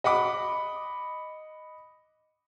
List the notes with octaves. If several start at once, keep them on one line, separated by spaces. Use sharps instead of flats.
D#5 F#5 B5 D6